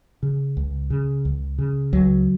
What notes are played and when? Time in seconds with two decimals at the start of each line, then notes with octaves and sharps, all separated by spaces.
0.23 C#3
0.57 C#2
0.90 C#3
1.25 C#2
1.58 C#3
1.93 C#2 F#3